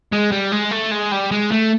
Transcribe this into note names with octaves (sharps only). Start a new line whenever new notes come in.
G#3
G3
G#3
A3
G#3
G3
G#3
A3